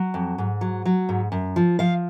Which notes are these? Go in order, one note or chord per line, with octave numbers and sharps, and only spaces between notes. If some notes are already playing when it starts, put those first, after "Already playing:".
Already playing: F#3
F2
G#2
F#3
F#3
G#2
F#2
F3
F3 F5